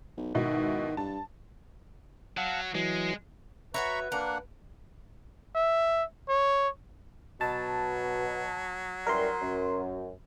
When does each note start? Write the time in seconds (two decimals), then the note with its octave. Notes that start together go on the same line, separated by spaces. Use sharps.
0.17 B1
0.35 G#2 B2 D#3 E4
0.97 G2 A5
2.37 F#3 F5 F#5 A5
2.75 E3 F#3 G#3
3.74 F#4 B4 C#5 E5 A#5 B5 C#6
4.12 A#3 D4 A#4 F#5
5.55 E5
6.29 C#5
7.41 B2 F#3 A5
9.07 F#2 E3 G3 A#4 C6
9.42 F#2